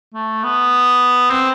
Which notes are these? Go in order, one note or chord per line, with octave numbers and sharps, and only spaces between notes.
A3
B3
C4